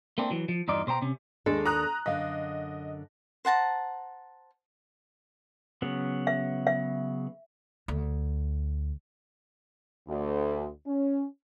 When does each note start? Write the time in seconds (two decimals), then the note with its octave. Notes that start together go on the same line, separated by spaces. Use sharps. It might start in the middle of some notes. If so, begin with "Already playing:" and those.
0.18 A3 A#3 C4 D4
0.30 E3 F#3
0.49 F3
0.68 E2 G2 D#4 F4 D5
0.87 B2 C5 G5 A#5
1.02 C3 C#4
1.46 D#2 G#3 D4 A4
1.66 A#5 D#6 F#6
2.06 F#2 D3 D#5 F5
3.45 C5 F#5 A5 A#5
5.82 C#3 F#3 B3
6.27 E5
6.67 E5
7.88 D2
10.08 D2
10.86 C#4